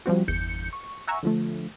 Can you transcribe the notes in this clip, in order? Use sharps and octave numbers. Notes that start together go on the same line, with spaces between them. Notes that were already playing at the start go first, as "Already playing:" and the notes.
F3 G3 C4 F#4
G1 E2 G6 C#7
C#6
E5 F#5 G#5 A#5 C#6 E6
D3 F3 A3